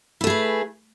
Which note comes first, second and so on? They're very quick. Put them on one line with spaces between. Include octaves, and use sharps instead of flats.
E4 A3 G#4 B4